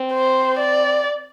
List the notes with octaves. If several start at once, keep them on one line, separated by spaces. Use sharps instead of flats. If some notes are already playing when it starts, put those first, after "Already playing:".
Already playing: C4
C5
D5